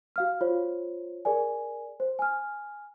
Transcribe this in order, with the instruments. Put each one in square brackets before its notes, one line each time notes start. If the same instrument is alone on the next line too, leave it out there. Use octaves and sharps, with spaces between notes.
[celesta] F#4 F5 F6
F4 C5 C#5
G#4 A#4 D5 G#5
C5
G#5 F6